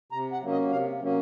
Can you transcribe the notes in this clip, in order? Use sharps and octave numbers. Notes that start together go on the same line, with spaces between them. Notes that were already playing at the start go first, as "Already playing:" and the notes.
C3 A#5
F#5
F#3 A#3 C#4
D#5
C3 F5
F#3 A#3 C#4